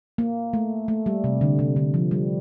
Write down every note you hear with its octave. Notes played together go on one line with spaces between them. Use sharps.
A#3
A3
A3
G3
C3
D3
C3
D3
F3
G3